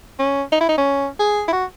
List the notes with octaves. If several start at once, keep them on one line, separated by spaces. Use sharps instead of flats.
C#4
D#4
E4
D#4
C#4
G#4
E4
F#4